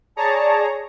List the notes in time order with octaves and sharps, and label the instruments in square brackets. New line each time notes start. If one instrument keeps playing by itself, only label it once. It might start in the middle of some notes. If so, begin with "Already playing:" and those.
[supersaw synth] G#4 C#5 A#5 [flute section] D5 A5